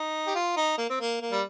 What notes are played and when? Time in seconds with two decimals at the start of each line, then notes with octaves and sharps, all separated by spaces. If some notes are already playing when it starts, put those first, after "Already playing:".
Already playing: D#4
0.27 G4
0.35 F4
0.57 D#4
0.78 A#3
0.90 C4
1.01 A#3
1.21 A#3
1.32 G3